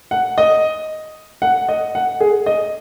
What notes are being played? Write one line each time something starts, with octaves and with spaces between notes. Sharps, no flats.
F#5
D#5
F#5
D#5
F#5
G#4
D#5